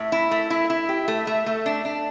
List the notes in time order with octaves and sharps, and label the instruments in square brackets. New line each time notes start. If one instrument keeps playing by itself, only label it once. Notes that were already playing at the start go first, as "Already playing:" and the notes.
Already playing: [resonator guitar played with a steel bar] A2 [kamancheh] E5
[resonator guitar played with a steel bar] E4
A3
E4
[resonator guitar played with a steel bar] E4 [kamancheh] E5
[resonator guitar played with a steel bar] G4
A3
A3
A3
D4
D4